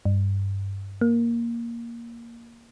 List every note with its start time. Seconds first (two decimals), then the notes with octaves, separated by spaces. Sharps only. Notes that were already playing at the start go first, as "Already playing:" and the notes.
0.05 G2
1.01 A#3